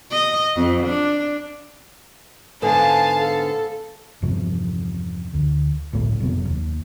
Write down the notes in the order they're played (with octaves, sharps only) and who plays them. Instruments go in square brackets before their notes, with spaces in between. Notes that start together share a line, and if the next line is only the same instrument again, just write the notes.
[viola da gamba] D#5
F2
D4
[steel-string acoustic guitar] G#2 D3 B3 [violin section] F5 A5 [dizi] G#5
[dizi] A4
[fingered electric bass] E2 G2 C3 F3
D2
G1 C#2 A2 A3
F1 C3 F#3 B3
D#2